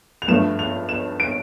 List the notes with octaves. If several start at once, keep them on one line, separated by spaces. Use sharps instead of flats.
F7
G2 F3 A3 E7
F7
E7
D7